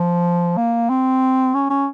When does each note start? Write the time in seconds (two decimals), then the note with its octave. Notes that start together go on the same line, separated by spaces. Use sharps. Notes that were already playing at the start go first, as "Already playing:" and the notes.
Already playing: F3
0.57 A#3
0.89 C4
1.54 C#4
1.70 C#4